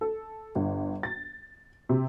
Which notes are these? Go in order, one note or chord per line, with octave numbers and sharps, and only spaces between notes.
A4
G1
A6
C3